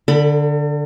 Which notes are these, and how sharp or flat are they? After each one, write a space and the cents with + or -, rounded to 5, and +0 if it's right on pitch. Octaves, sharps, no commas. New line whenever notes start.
D3 +0 A4 +45 B5 +0